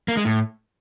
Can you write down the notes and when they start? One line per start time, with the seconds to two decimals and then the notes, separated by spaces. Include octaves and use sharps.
0.08 A#3
0.17 G#3
0.25 A2